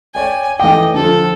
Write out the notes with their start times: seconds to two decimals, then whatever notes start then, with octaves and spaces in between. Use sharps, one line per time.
0.15 C#5 D5 G5 G#5
0.60 E3 A3 D#5 G5 D6
0.94 D3 F3 A4